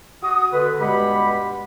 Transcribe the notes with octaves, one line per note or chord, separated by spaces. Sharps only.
F#4 D#6
B2 D3 B4
G2 B2 G#3 G4 F#5 B5